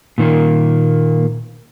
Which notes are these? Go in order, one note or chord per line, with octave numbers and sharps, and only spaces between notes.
A#2 D#3 A#3